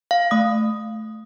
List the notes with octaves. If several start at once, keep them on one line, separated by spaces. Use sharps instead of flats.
F5
A3 D#6